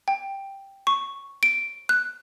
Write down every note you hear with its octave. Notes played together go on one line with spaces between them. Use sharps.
G5
C#6
D7
F#6